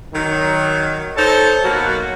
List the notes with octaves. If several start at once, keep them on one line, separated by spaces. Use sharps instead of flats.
D#3 F#3
D#4 A4 C5 C#5 A5
B2 F#3 A#3 F#4